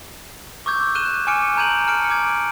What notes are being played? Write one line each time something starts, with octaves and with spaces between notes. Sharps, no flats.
C#6 D6 E6 G6 G#6
F#6 D#7 E7 G7
G#5 D6 F6 C#7 D7
A5 A#5 G6 G#6 D#7 F#7
A5 F6 C#7 D7
D6 G#6